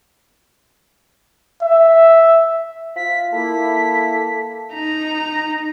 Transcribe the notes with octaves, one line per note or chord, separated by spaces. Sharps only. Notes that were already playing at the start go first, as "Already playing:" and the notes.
E5
F4 B6
A#3 E4 A4 B6
D#4 A#5